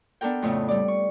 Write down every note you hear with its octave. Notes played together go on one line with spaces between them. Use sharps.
B3 D4 A4 A#4 G5
F2 A2 C#3 A3 B3
G3 D5
C#6